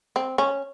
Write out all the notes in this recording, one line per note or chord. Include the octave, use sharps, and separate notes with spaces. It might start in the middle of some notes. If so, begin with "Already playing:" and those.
C4
C#4